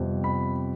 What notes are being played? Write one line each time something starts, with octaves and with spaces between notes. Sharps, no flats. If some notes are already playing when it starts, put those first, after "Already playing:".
Already playing: F2 C3 G3 B3
B5